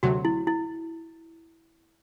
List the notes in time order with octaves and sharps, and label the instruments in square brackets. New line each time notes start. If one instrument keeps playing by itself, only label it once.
[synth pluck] D2 C3 F#3 A3 [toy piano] F#4
[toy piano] E4
E4